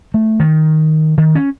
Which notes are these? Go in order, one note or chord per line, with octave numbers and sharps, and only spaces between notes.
A3
D#3
D#3
C#4